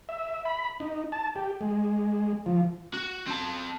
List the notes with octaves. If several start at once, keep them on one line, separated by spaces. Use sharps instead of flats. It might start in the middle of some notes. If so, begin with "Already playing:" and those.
E5
B5
D#4
A5
G4
G#3
F3
F#4
C4 A5